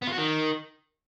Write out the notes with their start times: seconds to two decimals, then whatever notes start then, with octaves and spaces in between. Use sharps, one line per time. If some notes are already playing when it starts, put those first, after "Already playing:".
0.02 B3
0.07 F4
0.12 F#4
0.18 D#3